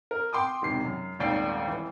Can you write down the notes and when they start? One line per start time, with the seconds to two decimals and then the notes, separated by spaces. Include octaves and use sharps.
0.11 A#4
0.33 G5 C6 D6 D#6
0.62 E1 C3 D#3 C7
0.85 F#2
1.19 D#1 G#1 D#2 D5 G5 C7
1.67 E3